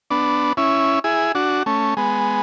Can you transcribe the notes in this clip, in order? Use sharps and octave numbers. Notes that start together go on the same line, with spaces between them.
B3 D4
C#4 E4
E4 G#4
D4 F#4
A3 C#4
G#3 B3